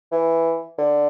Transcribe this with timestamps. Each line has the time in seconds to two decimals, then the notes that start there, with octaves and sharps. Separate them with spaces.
0.12 E3
0.78 D3